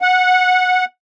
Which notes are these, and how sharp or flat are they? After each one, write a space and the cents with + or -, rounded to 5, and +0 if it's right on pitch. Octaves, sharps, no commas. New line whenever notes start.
F#5 -15